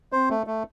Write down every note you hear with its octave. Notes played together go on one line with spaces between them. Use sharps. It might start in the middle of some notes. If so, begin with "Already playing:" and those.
C4 C5
A3
A3